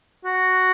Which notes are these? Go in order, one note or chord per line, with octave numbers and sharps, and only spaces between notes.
F#4